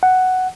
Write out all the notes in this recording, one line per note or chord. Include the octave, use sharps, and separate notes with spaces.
F#5